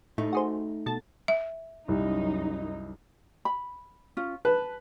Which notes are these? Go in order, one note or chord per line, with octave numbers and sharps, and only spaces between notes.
A2 A3 D#4
F#4 G#4 C5
B2 A4 A6
E5
C2 F#2 D#4
B5
C#4 F4
B4 A5